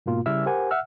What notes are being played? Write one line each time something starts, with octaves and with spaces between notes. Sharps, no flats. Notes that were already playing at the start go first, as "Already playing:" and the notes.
G#2 B2 A#3 F4
C#3 G3 E4 E5 E6 F6
G4 A#4 C5 F#5 G#5
E5 F#5 E6 F6